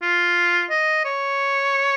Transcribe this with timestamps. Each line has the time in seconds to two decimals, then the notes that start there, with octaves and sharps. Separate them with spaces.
0.02 F4
0.70 D#5
1.05 C#5